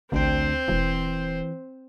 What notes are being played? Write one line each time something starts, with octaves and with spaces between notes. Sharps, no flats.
A1 D2 C4 D4 C5 G5
E1 E3